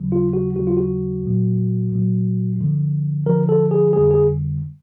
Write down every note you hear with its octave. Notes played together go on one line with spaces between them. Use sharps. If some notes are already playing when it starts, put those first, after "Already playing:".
Already playing: D#2 C#3 F#3
F4
F#4
D#2 C#3 F#3 F#4
F4
F#4
C2 A#2 F#3
C2 A#2 F#3
G2 D3 F3
G2 D3 F3 A#4
A4
G#4
F2 D3 G3 G#4
G#4